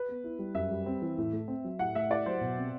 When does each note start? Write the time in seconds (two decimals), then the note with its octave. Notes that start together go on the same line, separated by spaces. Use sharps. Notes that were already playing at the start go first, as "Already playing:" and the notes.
Already playing: B4
0.09 B3
0.24 E4
0.39 G3
0.54 F#2 E5
0.71 G3
0.86 C4
1.02 E3
1.18 A2
1.33 A3
1.48 C4
1.64 F#3
1.79 A2 F#5
1.95 A3 E5
2.10 E4 D5
2.26 F#3 C5
2.41 B2
2.58 C4